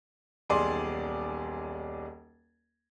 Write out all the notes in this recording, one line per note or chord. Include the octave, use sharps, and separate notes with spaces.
D#1 B1 G#4 D5 C6